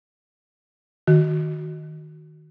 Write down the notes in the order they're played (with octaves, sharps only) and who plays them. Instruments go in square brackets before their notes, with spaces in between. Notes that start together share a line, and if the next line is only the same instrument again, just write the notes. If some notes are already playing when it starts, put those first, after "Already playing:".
[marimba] D#3 F#4